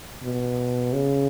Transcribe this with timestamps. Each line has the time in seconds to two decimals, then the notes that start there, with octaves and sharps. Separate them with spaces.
0.23 B2
0.93 C#3